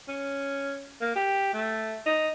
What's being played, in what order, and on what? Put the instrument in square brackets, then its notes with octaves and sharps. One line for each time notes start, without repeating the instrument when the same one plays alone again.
[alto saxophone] C#4
A#3
G4
A3
D#4